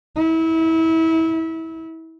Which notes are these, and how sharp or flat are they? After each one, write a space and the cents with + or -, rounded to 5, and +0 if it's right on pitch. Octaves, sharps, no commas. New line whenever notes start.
E4 -25